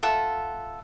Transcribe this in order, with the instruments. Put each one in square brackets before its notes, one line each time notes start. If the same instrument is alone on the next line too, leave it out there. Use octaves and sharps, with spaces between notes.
[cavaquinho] F4 A4 E5 F#5